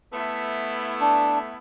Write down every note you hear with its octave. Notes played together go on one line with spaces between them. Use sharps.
A3 B3 E4
D4